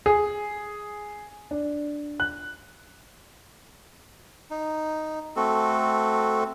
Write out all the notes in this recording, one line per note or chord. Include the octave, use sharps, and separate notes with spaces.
G#4
D4
F#6
D#4
A3 C4 F#4 A4